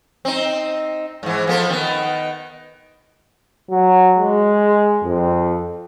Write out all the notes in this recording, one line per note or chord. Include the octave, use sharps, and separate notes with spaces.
C4 D#4
G#2 E3
F3 B3 A4
D#3 B3
F#3
G#3
F2